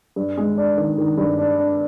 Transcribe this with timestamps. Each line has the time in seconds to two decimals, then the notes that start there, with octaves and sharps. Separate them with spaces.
0.16 G2
0.37 G#3
0.57 D4
0.77 D#3
0.98 D#3
1.18 G2
1.38 D4
1.59 D4